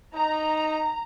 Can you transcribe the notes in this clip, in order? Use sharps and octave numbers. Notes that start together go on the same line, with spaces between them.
D#4 A#5